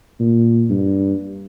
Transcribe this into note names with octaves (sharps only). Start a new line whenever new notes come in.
A#2
G2